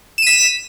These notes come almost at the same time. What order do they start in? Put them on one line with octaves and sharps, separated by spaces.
E7 D#7 B6